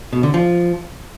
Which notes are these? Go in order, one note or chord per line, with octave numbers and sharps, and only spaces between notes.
B2
D3
F3